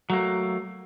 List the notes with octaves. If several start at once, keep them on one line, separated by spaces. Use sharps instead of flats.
F#3 A3 A#3